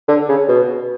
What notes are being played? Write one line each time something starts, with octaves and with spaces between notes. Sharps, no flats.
D3
C#3
B2